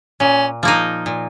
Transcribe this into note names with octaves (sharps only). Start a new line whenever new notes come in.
A#2 C#4
F3 A#3 D#4
A#2